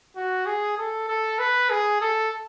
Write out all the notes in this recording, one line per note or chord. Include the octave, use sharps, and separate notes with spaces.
F#4
G#4
A4
A4
B4
G#4
A4